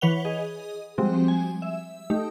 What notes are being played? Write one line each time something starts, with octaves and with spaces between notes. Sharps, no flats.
E3 B4 C#5 F#5 F7 G7
G#4 D#5
F3 G3 G#3 C4 F#4
G#5
E5
A3 D#4 G4